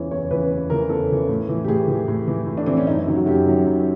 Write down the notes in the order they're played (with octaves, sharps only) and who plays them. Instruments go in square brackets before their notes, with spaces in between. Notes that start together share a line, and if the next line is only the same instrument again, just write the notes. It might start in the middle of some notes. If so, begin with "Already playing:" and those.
Already playing: [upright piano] E2 C#3 E3 C#5
E2 C#5
C#3 E3 B4
E2
C#3 E3 A#4
E2 A4
C#3 E3
A2
E3
G4
A2 G#4
E3
A2
E3
A2
D4
E3 C4
C#4
F#2 D#4
E4
D#3 F#3
F#4
F#2 G4
D#3 F#3
F#2